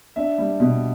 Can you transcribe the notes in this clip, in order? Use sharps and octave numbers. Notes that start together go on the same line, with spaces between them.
D4 E5
G3
B2